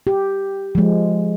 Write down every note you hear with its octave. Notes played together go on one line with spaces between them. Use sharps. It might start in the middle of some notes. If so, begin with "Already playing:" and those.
G4
F3 G#3